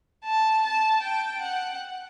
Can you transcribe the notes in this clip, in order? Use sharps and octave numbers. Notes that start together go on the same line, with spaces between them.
A5
A5
G5
F#5